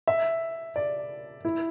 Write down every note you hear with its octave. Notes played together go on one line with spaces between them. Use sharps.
E5
D5
E4